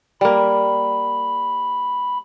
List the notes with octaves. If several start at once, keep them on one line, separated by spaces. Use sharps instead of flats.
G3 A#3 B5